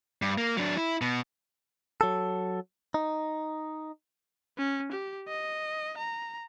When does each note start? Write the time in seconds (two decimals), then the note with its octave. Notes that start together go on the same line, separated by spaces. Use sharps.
0.22 G2
0.38 A#3
0.57 F#3 D4
0.77 E4
1.01 B2
2.01 F#3 A4
2.94 D#4
4.58 C#4
4.92 G4
5.28 D#5
5.97 A#5